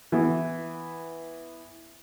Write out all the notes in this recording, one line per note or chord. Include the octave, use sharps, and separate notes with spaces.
E3 B3